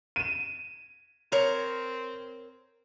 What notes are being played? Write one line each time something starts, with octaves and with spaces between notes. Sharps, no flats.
D#7 E7
C4 A#4 C#5